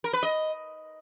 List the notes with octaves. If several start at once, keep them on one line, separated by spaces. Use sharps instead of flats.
A#4
B4
D#5